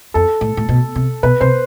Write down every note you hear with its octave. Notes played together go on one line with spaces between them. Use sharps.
F2 A4
A2
A2
B2
C3
B2 B4
C3 C5